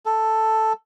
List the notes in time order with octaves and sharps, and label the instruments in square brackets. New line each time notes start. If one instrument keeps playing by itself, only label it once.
[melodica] A4